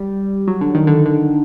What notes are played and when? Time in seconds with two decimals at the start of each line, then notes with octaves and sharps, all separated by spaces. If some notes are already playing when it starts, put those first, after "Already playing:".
Already playing: G3
0.48 F#3
0.61 D3
0.75 D#3
0.87 D3
1.06 D3